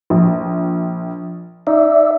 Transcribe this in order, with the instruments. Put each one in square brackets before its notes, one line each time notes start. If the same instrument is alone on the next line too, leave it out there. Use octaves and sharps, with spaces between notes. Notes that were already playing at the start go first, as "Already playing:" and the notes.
[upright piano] A#1
[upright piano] D#4 [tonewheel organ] D5 E5